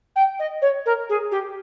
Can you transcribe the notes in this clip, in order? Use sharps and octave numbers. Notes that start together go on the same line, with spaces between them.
G5
D#5
C#5
A#4
G#4
G4